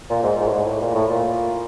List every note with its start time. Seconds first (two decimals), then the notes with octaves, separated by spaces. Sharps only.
0.10 A#2
0.23 G#2
0.38 G#2
0.48 A2
0.52 G#2
0.66 A2
0.81 A#2
0.94 A2
1.10 A#2